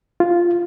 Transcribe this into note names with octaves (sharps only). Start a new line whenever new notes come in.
F4